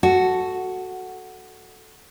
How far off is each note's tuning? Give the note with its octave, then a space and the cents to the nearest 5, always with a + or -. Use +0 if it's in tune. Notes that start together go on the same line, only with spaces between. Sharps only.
F#4 +0 A4 +0